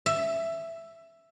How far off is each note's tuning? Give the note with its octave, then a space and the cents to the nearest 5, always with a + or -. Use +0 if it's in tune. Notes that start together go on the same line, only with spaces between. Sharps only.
E5 +10